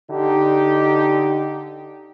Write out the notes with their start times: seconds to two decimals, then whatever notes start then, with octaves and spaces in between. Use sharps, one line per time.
0.11 D3 D#4 G4